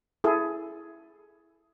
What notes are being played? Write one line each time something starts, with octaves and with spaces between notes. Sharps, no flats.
E4 G#4 A4